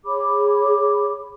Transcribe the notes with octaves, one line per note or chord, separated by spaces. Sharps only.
G#4 C#5 B5 D6